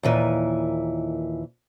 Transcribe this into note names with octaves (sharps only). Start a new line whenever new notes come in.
D#2 A#2 E3